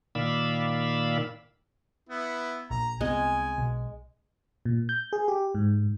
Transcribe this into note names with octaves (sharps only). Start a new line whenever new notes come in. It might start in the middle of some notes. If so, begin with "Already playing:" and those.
A#2 D#3 D5 F5 B5 E6
B3 E4
A#1 A#5
C2 G#3 B3 C4 G#5
B1
A#2
G6
G#4
G4
G#2